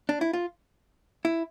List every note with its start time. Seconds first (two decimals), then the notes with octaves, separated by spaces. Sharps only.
0.09 D4
0.21 E4
0.33 F4
1.25 E4